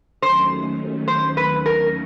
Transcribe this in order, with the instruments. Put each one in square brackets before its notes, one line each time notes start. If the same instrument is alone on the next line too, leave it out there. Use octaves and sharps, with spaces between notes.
[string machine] D#2 D#3 F#3 A3 C#4 [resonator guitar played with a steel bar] C5
[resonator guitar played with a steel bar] C5
B4
A#4